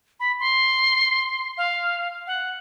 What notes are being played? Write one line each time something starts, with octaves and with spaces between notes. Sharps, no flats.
B5
C6
F5
F#5